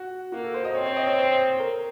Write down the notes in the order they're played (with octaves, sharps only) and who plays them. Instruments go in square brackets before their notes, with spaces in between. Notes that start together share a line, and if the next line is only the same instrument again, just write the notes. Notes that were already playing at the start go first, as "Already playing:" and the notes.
Already playing: [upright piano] F#4
[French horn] A#3 [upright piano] F#4
[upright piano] A4
C5
D#5
[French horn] C4 [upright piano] C#5
[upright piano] C#5
D#5
C#5
C5
A#4